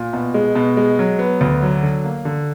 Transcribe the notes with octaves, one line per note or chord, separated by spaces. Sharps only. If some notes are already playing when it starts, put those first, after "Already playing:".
Already playing: A#2
B2
G#3
B2
G#3
F#3
B3
D2
F#3
D3
A#3
D3